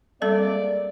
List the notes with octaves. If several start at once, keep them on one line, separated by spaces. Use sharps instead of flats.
G3 G#3 A#3 C4 A4 D5